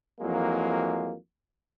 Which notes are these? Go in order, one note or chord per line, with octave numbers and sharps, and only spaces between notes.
F2 E3 F#3 G#3 A#3